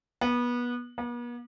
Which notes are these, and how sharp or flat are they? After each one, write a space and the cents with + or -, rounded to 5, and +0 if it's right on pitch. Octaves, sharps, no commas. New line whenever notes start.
B3 -25
B3 -45